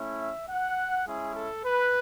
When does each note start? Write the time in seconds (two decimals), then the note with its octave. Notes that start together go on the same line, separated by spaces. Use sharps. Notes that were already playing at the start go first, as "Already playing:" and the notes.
Already playing: A3 C#4 E4
0.19 E5
0.49 F#5
1.06 G#3 C#4 E4 G#4
1.35 A4
1.65 B4